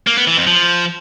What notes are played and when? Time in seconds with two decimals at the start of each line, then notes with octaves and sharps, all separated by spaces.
0.07 A#3
0.17 B3
0.27 E3
0.37 F2
0.47 F3